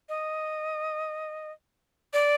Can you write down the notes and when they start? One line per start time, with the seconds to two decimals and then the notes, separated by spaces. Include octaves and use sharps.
0.09 D#5
2.13 D5